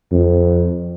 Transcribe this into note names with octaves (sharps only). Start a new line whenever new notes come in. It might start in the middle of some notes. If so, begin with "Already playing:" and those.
F2